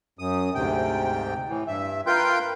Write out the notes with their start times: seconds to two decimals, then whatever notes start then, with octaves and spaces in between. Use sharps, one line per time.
0.19 F#2 D#6
0.55 D2 G#2 C3 G5
1.48 A2 E3
1.67 G2 E5
2.07 F4 A#4 B4 G5 C6 G6